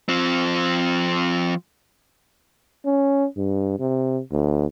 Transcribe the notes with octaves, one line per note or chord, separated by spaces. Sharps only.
F3 C4
C#4
G2
C3
D2